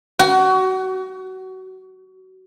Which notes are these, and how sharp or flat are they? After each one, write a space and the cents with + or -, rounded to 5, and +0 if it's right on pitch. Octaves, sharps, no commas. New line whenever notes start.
F#4 +25